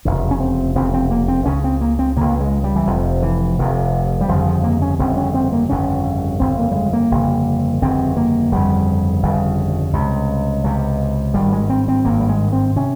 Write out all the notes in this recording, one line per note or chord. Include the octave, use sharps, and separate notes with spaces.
F1 E2 C#3 C#4
C#4
C4
F1 E2 C#3 C4
C4
A#3
C4
C#2 C#3 C#4
C4
A#3
C4
C#2 C#3 A#3
G#3
G3
E3
F1 F2 C3 F3
E3
F1 F2 C3
G3
G1 F2 C#3 F3
F3
A#3
C#4
G1 F2 C#3 C4
C#4
C4
A#3
G1 F2 C#3 C#4
G1 F2 C#3 C4
A#3
G3
G#3
A#3
G1 F2 C#3
G1 F2 C#3 C4
A#3
G1 F2 C#3 G3
G1 F2 C#3
C#2 C3
C#2 C3
G#1 G2 G3
G#3
C4
C4
G#1 G2 A#3
G3
G#3
C4
C3 C#4